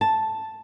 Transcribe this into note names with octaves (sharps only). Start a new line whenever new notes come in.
A5